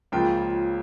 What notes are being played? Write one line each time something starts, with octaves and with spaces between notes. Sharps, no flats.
C#2 C#3 F3 A#3 F4 G5